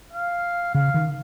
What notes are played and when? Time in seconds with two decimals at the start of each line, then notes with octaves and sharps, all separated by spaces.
0.13 F5
0.74 C#3 F5
0.94 D#3